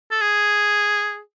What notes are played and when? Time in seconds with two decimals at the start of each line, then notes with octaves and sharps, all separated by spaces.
0.11 A4
0.22 G#4